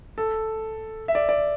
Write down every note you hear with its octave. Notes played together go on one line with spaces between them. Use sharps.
A4
E5
D5
D5